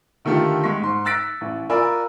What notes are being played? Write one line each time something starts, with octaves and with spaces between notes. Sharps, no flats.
D3 D#3 A3 F4 G4
G#3 C#6 B6
G#2 C6
E6 F#6 A6 B6 D7
A1
F4 A#4 D5 G#5 B5 E6